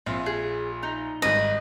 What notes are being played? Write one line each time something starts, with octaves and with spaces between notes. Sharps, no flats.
A#1 C4 F4 E5
G#4
D#4
G#1 G2 D#5